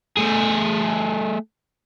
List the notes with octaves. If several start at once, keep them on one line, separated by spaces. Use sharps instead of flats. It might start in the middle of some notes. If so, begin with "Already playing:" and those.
A3 G#4